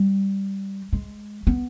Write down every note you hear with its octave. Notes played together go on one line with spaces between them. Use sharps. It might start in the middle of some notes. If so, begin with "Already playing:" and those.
Already playing: G3
G#3
B3